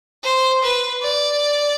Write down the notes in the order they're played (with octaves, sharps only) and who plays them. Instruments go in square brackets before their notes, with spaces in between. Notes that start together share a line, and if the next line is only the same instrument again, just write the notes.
[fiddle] C5
B4
D5